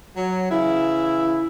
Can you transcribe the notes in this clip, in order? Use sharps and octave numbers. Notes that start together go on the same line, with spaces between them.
F#3
C#3 E3 E4